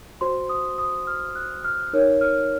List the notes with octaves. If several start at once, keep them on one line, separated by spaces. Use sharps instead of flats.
F#4 C5 C6
D#6
D#6
F6
F#6
F6
D#4 A#4 C#5
F6